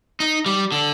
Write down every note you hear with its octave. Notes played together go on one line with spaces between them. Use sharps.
D#4
G3
D3